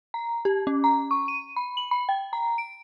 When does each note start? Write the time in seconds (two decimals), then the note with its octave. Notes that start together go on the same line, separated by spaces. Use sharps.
0.14 A#5
0.45 G4
0.67 C#4
0.84 A#5
1.11 C#6
1.28 D#7
1.56 B5
1.77 F#7
1.91 B5
2.09 G5
2.33 A#5
2.58 D7